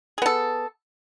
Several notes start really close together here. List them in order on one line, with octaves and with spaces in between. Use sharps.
G#4 B3 A4